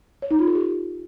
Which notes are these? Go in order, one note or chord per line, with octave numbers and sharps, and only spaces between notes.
C#5
D#4
F4
A4
G4